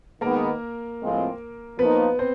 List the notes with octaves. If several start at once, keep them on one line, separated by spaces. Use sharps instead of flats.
D#3 G#3 A#3 B3 A#4
A2 F3 G#3 C4 F4
F3 A#3 B3 D#4 B4
C4 C5